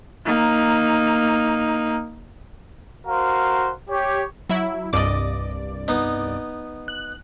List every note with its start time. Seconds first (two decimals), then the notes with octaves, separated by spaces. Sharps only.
0.26 A#3 D#4
3.07 F#4 A#4 C5 F5
3.90 G4 C#5
4.49 F#3 E4
4.93 C2 G2 D5 D#5 D6
5.88 B3 D#4
6.88 F#6